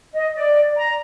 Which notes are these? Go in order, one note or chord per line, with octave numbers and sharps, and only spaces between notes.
D#5
D5
A#5